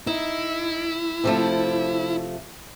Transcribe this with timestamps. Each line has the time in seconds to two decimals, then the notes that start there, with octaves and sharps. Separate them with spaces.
0.07 D#4 E4
1.24 C3 F3 A3